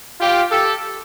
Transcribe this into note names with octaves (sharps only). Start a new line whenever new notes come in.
F4 G4
G4 A4